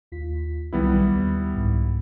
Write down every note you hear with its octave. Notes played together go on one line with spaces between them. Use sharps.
D#2 F4 B6
C2 D#3 F#3 G3 B3 E4
D#2
C2 G#2